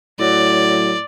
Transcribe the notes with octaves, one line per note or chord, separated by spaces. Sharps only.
A2 F#3 D5